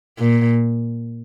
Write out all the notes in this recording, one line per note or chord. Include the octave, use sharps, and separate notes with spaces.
A#2